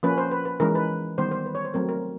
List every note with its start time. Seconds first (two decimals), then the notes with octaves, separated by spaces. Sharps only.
0.03 F3 A#3 C#4 B4
0.18 C5
0.31 B4
0.45 B4
0.60 E3 G#3 C#4 A#4
0.75 B4
1.18 D#3 G3 B3 C5
1.31 C5
1.46 B4
1.55 C#5
1.65 C5
1.74 F#3 A3 C4 A#4
1.89 A#4